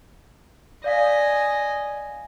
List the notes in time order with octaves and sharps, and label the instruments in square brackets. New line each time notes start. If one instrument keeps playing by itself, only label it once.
[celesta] D5 F5 B6 [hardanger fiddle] D#5 G#5